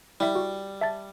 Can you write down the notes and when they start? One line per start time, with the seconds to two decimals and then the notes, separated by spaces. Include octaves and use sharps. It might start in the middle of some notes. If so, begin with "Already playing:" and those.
0.20 G3 E4 E5
0.35 F#4
0.81 E5 A5 A6